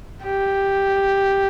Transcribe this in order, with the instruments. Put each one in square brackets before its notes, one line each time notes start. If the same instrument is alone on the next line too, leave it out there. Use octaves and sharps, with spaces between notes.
[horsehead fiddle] G4